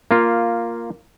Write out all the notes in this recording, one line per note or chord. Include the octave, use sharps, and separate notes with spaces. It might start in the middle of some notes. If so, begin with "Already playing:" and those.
A#3 F4